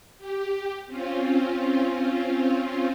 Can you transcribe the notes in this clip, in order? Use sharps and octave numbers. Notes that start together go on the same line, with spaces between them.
G4
C4 C#4 F4